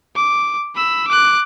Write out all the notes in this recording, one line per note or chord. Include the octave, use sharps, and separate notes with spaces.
D6
B5 E6
D6 F#6